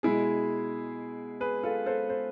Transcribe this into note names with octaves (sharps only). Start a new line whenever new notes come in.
B2 G#3 E4 G#4
G#4 B4
F4 A4
A4 C5
A4 C5